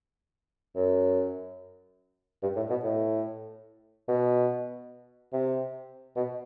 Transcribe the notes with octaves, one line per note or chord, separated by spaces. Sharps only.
F#2
G2
A2
B2
A2
B2
C3
B2